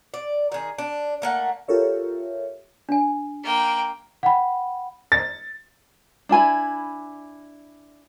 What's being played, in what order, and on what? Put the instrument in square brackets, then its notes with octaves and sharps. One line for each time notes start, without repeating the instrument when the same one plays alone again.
[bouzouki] D5
D#3 G#4
D4
A3 A#3 F#5
[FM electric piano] F4 G4 A4 A#4 C#5 E5
[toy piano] D4 G#5
[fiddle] A#3 G5
[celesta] F#5 G5 B5
[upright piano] A6
[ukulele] D4 E4 G#5 B5